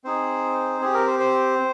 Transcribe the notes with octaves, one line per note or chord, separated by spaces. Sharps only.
C4 D#4 G#4 C5
C4 G4 G#4
A#4
C5
C5